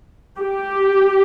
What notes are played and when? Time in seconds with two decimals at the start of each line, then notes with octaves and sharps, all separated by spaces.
0.40 G4